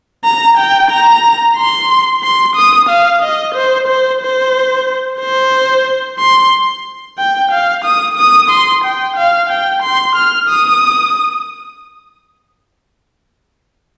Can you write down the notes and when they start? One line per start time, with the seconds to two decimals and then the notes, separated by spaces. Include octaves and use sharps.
0.24 A#5
0.58 G5
0.91 A#5
1.57 C6
2.23 C6
2.56 D#6
2.89 F5
3.22 D#5
3.55 C5
3.88 C5
4.21 C5
5.20 C5
6.19 C6
7.18 G5
7.51 F5
7.84 D#6
8.17 D#6
8.50 C6
8.84 G5
9.17 F5
9.49 G5
9.83 C6
10.15 F6
10.49 D#6